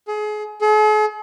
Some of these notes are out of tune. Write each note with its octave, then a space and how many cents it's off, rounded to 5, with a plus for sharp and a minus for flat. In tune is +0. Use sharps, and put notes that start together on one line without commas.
G#4 +30
G#4 +45